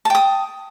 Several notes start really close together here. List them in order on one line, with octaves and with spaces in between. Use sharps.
A5 G5 D#6